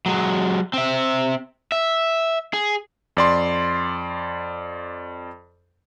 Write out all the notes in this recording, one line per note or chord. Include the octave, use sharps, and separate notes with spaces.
F#3 G#3
C4 E5
E5
G#4
F2 D5 C6